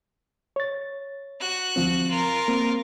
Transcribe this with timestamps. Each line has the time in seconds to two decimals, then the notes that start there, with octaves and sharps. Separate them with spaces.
0.56 C#5 A6
1.40 F#4 F#6
1.76 D2 F3 C4
2.10 F4 A#4
2.48 A#3 C4